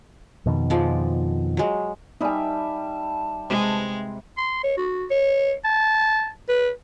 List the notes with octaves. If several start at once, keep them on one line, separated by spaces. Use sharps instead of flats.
F2 B2 D#3
F3 G#3 D5
F#3 G#3
G3 D#4 E5 G#5 A5
C3 G#3
C6
C#5
F#4
C#5
A5
B4